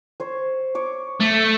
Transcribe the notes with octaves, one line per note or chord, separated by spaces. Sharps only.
C5 C#5
C#5 D6
A3